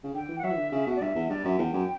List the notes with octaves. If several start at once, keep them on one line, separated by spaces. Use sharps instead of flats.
C#3
D3 G5
E3
F#5
F#3 E5
E3
D3
C#3
B2
D5
G2 E5
E2
G2 D5
F#2 E5
E2 G5
F#2